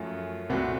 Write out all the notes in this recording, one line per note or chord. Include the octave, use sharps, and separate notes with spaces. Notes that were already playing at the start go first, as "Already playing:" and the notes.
Already playing: F#2 F3 A3 C#4 F4
C2 A#2 A3 C4 F#4